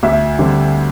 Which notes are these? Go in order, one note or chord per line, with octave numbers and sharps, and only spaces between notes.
D2 E5
D3 G3 C4